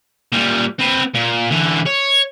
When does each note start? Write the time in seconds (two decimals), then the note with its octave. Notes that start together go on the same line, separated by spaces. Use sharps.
0.32 A#2 G3
0.79 C4 B4
1.14 A#2
1.51 D3 E3
1.86 C#5